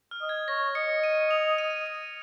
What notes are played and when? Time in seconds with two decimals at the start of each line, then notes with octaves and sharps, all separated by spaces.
0.11 F6
0.21 D#5
0.29 G#6
0.48 C#5 A#6
0.75 D#5 C#7
1.04 D#7
1.31 F7
1.58 D#7
1.86 D#7